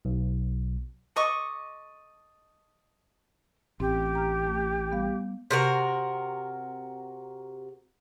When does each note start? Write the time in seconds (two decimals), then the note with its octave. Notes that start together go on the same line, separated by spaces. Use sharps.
0.05 B1
1.16 A4 D#5 C#6 D6
3.80 A1 C4 G4
4.15 A#5 F6
4.47 A3
4.91 G3 B3 F5
5.51 C3 F#4 A#4